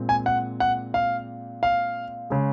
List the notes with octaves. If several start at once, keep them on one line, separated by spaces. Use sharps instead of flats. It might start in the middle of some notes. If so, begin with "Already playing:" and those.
Already playing: A#2 G#3 C4
G#5
F#5
F#5
F5
F5
C#3 G#3